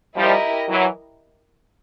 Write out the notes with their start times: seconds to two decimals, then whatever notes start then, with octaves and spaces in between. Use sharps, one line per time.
0.16 F3 G3 E4 G4 A#4 D#5
0.69 E3 F#3